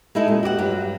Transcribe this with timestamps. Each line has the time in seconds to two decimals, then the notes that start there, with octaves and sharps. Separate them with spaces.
0.15 G#3 D#4 E4 G#4 A4
0.28 A#2 C#4
0.43 F#4 G4 D5 F#5
0.58 G2 F#3